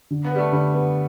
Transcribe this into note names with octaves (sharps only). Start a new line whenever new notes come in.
D3
B3
G3 B4
A3
D3 G3
B3